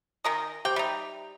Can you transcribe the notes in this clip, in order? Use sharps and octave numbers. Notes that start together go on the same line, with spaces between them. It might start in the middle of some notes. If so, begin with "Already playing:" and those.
D#3 A#4 D#5 G#5
G4 C5 G5 D6
G3 D#4 E5 F7